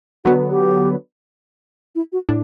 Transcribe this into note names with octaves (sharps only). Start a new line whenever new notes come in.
D3 F#3 B3 F#4
G4
E4
F#4
A2 D4